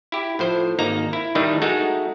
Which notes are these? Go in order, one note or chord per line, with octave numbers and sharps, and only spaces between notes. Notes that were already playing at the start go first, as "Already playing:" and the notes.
E4 G4
A2 F3 C5
G#1 A#3 D#4 A#5
E4
A2 D#3 G3 A3 D#4
G#3 A3 D#4 F#4